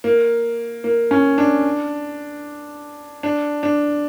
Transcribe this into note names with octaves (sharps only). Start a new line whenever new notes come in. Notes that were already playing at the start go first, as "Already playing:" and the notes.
A#3
A#3
C#4
D4
D4
D4